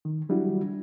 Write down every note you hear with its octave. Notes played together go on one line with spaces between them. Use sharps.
D#3
F#3 G3 D4 E4 F#4